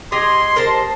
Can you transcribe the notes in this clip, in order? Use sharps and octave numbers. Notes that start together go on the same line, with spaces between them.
G4 G#4 D#5 C6
A#4 C5 A5